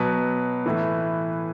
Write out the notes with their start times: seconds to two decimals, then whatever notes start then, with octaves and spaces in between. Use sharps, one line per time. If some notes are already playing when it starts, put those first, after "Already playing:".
Already playing: B2 F#3 B4
0.66 A2 E3